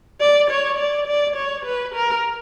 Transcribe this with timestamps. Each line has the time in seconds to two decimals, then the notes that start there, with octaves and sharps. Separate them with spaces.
0.21 D5
0.50 C#5
0.79 D5
1.07 D5
1.36 C#5
1.65 B4
1.94 A#4